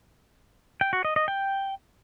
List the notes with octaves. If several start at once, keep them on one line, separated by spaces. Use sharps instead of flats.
G5
F#4
D#5
D#5
G5